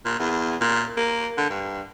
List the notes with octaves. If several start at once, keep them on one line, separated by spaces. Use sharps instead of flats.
A#2
E2
A#2
A#3
D3
G2